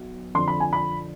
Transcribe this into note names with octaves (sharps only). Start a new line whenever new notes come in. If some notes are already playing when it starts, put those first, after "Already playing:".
Already playing: B1 B2
F2 D3 F3 C6
B5
G#5
B5